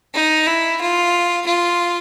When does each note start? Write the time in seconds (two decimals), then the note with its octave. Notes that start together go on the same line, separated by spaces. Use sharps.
0.14 D#4
0.47 E4
0.81 F4
1.46 F4